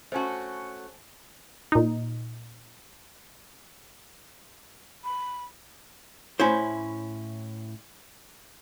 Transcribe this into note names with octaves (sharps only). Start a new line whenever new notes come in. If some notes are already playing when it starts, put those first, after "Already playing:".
A3 C#4 F#4 C5 G#5 A5
A#2 D#4
B5
A2 C#4 E4 C5